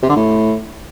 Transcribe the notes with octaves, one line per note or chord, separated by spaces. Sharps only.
C3
D3
A2